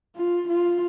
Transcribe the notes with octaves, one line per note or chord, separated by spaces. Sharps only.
F4
F4